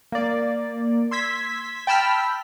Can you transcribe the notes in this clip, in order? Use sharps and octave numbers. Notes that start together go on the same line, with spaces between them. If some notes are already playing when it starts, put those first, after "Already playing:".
A#3 D5
C6 E6 G#6 B6
G5 A5 B5 E6 F6 B6